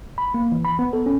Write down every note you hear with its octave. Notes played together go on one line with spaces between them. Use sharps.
B5
A#3
E3
B5
B3
A4
C#4